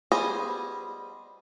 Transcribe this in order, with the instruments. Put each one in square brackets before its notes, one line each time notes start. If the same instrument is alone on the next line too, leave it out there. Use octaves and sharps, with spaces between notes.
[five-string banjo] G3 B3 G#4 C5 D#5